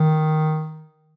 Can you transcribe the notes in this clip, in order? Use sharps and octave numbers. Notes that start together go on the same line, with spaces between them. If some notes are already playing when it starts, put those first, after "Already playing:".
Already playing: D#3